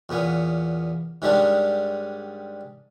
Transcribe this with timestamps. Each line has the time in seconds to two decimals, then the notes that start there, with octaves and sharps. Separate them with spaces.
0.09 E2 A#2 B3 C#4
1.22 G#2 D#3 G3 G#3 C#4 D4